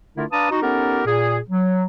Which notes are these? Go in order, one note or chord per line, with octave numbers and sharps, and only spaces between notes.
D3 A3 D4 E4 F4 A#4
D4 B4 F5 A5 A#5 D#6
D#4 F#4
B3 C#4 D#4 G4 A4 A#4
A#2 G#4
F#3